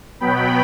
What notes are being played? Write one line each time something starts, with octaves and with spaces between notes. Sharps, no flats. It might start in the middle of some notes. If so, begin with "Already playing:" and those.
B2 F#3 B3 G5 B5